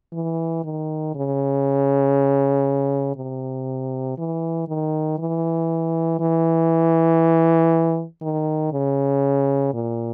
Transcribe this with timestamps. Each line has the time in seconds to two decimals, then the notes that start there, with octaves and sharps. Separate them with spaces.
0.13 E3
0.64 D#3
1.15 C#3
3.16 C3
4.18 E3
4.68 D#3
5.19 E3
6.20 E3
8.22 D#3
8.72 C#3
9.74 A#2